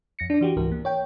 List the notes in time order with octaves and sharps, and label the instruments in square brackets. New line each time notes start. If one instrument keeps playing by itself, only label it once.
[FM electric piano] F2 A#6 C#7
D4 D5
E3 F#4 G4
C#2 G#2 E3 A#4
A#3
C#5 G5